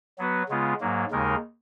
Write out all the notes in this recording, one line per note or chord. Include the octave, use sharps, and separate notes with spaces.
F#3 B3 F#4 B4
C#3 G#3 B3 F4
G#2 F#3 A#3
D#2 C#3 G#3 D#4 A#4